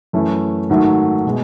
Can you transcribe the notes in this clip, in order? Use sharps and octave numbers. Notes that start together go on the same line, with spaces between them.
F#2 E3 A3 C#4
G#2 D#3 F#3 A3
B2 G#3